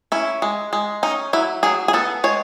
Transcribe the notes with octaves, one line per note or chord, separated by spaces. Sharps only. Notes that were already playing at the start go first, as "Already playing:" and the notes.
C#4 E4
G#3
G#3
C#4 D#4
F#3 E4
F#3 G#4
G#4
B3 A4
G#3 C#5